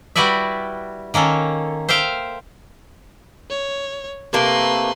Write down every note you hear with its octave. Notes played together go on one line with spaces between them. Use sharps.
G3 E4 F#4 B4 D5 E5
D#3 A#3 C#4 A4
C5 E5 F5 G5
C#5
C3 A3 A#3 B4 C6